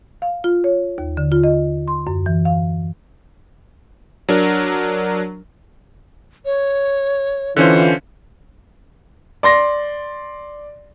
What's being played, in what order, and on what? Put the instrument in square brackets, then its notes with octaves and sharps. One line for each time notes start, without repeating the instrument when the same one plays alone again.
[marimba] F5
F4
C#5
D#2
D3
F4
D#5
C6
F#2
E3
F5
[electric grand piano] F#3 D4 A#4
[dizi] C#5
[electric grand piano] D3 C#4 C5 [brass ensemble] E3 F4
[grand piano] D5 C6 A#6